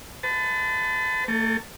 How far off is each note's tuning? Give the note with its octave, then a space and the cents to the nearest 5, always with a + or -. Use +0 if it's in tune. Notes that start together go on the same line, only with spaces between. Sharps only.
B4 +45 A5 +0
A3 +40 A4 -10